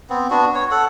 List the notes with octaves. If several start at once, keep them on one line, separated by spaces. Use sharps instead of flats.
B3 C4
B3 D4 F#4
C#5
A4 F#5